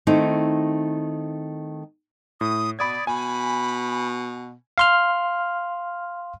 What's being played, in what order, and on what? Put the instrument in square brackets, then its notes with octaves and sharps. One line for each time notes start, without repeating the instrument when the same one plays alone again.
[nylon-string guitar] D#3 A3 C4 D#4 E4
[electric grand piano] A2 [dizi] D#6
[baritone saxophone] B2 [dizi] D5 [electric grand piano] B5 D#6 G#6
[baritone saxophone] B2 [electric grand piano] G#5 [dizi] B5
[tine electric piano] F5 C6 F6